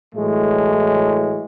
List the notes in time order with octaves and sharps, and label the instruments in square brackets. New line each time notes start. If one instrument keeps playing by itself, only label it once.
[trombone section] A2 E3 F#3 G#3 A3